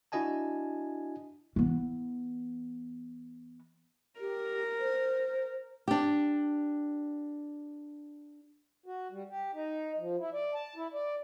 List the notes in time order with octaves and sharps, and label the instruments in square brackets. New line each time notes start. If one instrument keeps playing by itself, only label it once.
[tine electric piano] D4 E4 F#4 D#5 G#5 A5
[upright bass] E3 B3
[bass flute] G4 [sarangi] A#4
[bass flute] C5
[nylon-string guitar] D4 G4
[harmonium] F#4
G3
G4
D#4
F3
E4
D5
A5
E4
D5